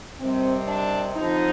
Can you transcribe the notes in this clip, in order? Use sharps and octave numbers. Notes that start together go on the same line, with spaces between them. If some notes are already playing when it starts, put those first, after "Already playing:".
C3 D#3 G3 C4
D4
F2 D3 F3 D#4